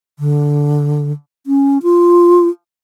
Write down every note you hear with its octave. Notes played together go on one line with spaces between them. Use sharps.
D3
C#4
F4